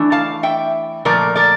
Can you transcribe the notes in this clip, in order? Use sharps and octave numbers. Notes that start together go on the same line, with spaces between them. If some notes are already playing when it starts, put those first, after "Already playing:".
Already playing: E3 A3 D4
F5 A5
E5 G5
A#2 F3 A3 A#4 D5
A#4 D5